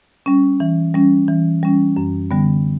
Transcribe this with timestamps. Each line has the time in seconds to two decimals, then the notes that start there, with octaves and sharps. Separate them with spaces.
0.26 G3 C#4
0.60 E3
0.94 G3 C#4
1.28 E3
1.63 G3 C#4
1.97 F#2
2.31 D3 G3 B3